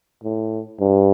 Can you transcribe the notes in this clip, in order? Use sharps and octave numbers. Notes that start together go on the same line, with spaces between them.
A2
G2